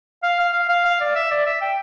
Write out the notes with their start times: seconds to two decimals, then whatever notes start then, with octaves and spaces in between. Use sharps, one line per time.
0.23 F5
0.39 F5
0.54 F5
0.69 F5
0.85 F5
1.00 D5
1.15 E5
1.31 D5
1.46 E5
1.61 G5